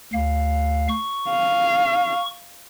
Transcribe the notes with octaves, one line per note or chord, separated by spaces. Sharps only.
D2 F5
C#6
F5